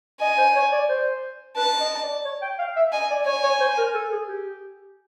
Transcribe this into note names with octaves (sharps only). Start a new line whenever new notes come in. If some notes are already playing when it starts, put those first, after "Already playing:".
D#5 G#5
C5
C#5
D5
C5
B4 A5
D#5
D5
C#5
G5
F5
E5
D#5 G#5
D5
C#5 G#5
C#5
C5
A#4
A4
G#4
G4